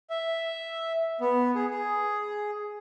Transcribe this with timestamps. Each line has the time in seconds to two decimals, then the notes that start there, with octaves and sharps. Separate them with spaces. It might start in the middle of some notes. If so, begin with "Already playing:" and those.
0.10 E5
1.21 B3
1.55 G#4
1.71 G#4